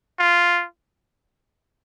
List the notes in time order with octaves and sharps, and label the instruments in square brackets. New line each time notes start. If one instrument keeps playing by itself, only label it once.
[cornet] F4